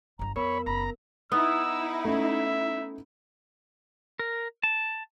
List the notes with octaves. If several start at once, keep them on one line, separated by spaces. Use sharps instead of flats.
G1 G2 A#5
F2 B3 A#4 C#5 B5
F#1 A#5 B5
B3 D#4 E4 E6
A3 C#4 E5
A#4
A5